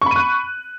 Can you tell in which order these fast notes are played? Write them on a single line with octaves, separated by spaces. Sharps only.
C#6 B5 D#7 F#6